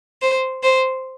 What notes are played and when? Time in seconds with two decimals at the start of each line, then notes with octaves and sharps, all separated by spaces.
0.22 C5
0.63 C5